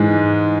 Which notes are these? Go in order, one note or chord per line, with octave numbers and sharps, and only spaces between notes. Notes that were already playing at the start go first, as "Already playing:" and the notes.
Already playing: G#2 E3 G#3